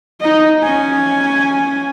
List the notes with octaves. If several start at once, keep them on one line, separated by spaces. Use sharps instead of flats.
D#4 D#5
C#4 G#5